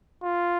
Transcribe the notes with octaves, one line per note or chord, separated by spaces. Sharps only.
F4